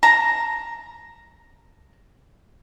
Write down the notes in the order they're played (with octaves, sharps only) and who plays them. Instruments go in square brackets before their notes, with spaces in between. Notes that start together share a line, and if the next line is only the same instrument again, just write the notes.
[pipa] A5 A#5